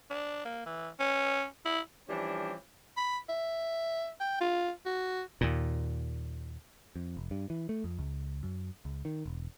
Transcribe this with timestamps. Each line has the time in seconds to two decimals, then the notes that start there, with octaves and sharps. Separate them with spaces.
0.10 D4
0.45 A#3
0.66 E3
1.00 C#4
1.66 E4
2.08 E3 F3 G3 C#4 D4
2.97 B5
3.29 E5
4.20 G5
4.41 F4
4.86 F#4
5.41 D#2 A#2
6.96 F2
7.17 F1
7.31 G2
7.50 E3
7.69 A3
7.84 F2
7.99 C#2
8.43 F#2
8.85 C#2
9.05 D#3
9.26 E1